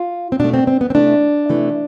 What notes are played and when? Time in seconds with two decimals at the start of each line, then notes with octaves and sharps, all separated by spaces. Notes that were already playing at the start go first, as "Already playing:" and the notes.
Already playing: F4
0.32 C4
0.40 B2 A3 D4
0.54 C4
0.67 C4
0.81 B3
0.90 C4
0.94 C3 E3 A3 D4
1.49 C3 E3 A3